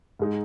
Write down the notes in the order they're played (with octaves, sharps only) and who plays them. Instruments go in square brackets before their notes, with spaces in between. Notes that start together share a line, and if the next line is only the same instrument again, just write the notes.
[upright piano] G#2 G#3 D#4